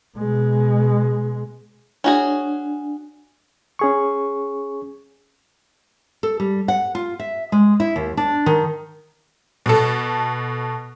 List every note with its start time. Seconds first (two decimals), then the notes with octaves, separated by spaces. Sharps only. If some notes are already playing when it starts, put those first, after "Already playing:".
0.17 B2 G#3
2.04 C#4 D4 F#4 G#4
3.79 C#4 G#4 C#6
6.23 A4
6.40 G3
6.68 F#5
6.95 F4
7.20 E5
7.52 G#3
7.80 E4
7.96 D#2
8.17 D4
8.46 D#3
9.66 B2 A4